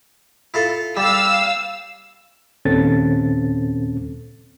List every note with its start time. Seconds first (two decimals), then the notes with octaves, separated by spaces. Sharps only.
0.54 E4 F4 A4
0.97 G3 F5 E6
2.65 D#2 A#2 C4 C#4 A4 A6